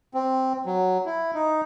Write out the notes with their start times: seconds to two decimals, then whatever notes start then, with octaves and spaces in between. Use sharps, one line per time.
0.14 C4
0.66 F#3
1.06 E4
1.35 D#4